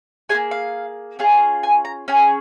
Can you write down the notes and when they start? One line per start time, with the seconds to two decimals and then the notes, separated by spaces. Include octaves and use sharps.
0.29 F4 G#4 G#5
0.34 A#3
0.51 F5
1.19 C#4 F4 G#4
1.63 G#5
1.85 A#5
2.08 C#4 G#4 G#5